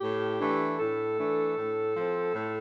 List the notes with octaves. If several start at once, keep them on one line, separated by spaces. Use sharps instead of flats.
A2 G4
E3 A3 D4
A2 A4
E3 A3 D4
A2
F3 C4
A2